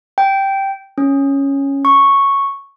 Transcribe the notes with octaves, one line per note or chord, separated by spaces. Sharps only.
G5
C#4
C#6